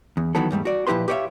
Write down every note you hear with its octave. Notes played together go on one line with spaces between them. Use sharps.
E2
D#3 E3 F#3 B3 A4
E2 G#2 G3 A3
F#4 D5
A#2 F3 E4 G4 B4 C6
G4 B4 C#5 D5 E5 F5